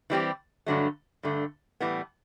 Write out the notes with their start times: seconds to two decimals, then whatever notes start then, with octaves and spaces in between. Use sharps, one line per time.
0.10 E3 G3 C4 G4
0.66 G2 D3 F#3 A3
1.23 G2 D3 A3
1.80 A2 E3 G3 B3